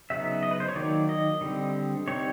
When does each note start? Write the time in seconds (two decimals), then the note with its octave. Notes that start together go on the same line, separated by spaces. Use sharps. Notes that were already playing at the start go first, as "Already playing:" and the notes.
0.10 C#3 F#3 B3 D#4 E5
0.43 D#5
0.51 B4
0.60 C5
0.68 C#5
0.76 D#3 F#3 A#3 D#4 D5
1.09 D#5
1.41 D3 G3 C4
2.08 G3 C4 D#4 C#5